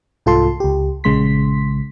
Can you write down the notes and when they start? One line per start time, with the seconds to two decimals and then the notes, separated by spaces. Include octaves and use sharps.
0.26 C2 G#2 F4 A4 A5 C6
0.60 C#2 G4
1.04 A#1 C#3 G#3 C6 B6